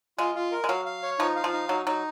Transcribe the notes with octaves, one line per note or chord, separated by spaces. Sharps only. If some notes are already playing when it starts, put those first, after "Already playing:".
G#3 F4
F4
A#4
G#3
F#3 F5
F5
C#5
F3 D#4
F5
F3
D#4
F#3 D#4
F#3 D#4